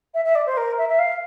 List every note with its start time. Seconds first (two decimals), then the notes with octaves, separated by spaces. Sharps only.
0.14 E5
0.24 E5
0.35 D5
0.46 C5
0.57 A#4
0.78 E5
0.88 E5
0.98 F5